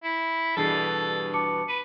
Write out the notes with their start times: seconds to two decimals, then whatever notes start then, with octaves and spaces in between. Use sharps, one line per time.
0.04 E4
0.57 G2 B2 E3 G#4 A4 A6 C7
1.33 A5 D6 C#7
1.68 B4 D#7